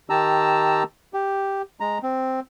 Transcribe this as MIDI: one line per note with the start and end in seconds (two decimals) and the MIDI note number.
0.10 0.83 51
0.10 0.83 67
0.10 0.83 81
0.10 0.83 82
0.10 0.83 88
1.14 1.62 67
1.80 1.98 56
1.80 1.98 82
2.03 2.40 60